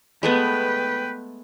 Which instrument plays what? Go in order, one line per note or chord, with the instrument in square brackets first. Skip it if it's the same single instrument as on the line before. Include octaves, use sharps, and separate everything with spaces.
[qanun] G#3 A3 B3 [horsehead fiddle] B4 G5